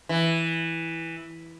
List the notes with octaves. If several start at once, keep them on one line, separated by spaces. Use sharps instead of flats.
E3